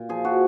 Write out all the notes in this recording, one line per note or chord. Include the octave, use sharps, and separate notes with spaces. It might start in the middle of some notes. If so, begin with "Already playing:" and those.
Already playing: A#2
F3 G#4
F3 F#4